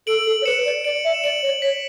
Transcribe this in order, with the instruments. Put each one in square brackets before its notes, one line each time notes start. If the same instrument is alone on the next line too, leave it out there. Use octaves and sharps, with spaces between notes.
[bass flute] A4 [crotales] D7 F#7
[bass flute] A4
C#5
[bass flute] B4 [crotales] C#7 E7
[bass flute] D5
[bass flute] D5 [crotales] D7 F#7
[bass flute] E5
[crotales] E7
[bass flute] D5 [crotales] D7 F#7
[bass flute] C#5
[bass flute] C#5 [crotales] B6